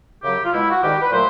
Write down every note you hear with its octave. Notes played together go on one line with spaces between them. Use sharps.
F#2 C#3 F#3 G4
F4
B2 G#3 E4
F#4
G#2 D#3 G3 G4
B4
A#2 F#3 A3 C5